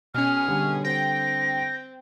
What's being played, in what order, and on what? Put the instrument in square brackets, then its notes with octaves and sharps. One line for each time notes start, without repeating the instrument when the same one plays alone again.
[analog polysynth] B2 C#4 [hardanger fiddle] G#4 [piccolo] F6
[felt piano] D3 G3 A4
[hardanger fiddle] C4 [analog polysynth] G5 [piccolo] A#6